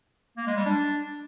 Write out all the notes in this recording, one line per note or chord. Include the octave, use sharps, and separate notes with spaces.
A#3
G#3
G3
D4